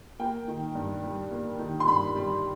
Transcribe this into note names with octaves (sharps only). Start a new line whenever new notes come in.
A#3 G5
D#3
G2
G3
A#3
D#3
C6
G2 B5
G3